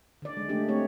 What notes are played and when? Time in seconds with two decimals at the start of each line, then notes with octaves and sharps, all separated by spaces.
0.22 D3 D5
0.37 G#3
0.49 A3 D4 G4
0.69 A3 C4 G4 C#5